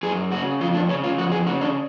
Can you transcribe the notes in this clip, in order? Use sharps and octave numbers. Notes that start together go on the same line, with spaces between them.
F#2 G#4
C#3 F#4
F2 F4
D4
C#3 C#4
F4
F2 F#4
G#4
C#3 F#4
D4